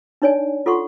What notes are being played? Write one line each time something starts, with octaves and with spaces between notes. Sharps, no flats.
D4 D#4 C#5 D5 G#5
F4 A4 F#5 C6 C#6